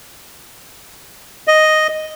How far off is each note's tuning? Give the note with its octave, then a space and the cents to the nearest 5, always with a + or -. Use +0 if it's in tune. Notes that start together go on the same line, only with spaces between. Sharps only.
D#5 +0